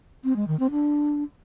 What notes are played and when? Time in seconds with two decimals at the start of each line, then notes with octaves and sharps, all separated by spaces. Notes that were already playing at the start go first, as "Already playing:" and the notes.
0.24 C4
0.36 G#3
0.48 D#3
0.59 C4
0.71 D4